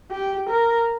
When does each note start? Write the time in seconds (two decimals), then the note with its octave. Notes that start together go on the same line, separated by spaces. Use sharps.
0.11 G4
0.49 A#4